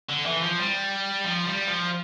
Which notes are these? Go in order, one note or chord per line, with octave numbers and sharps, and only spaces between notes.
D3
E3
F3
G3
F3
G3
F3